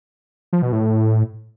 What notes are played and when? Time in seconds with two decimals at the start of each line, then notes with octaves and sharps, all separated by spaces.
0.53 F3
0.62 B2
0.72 A2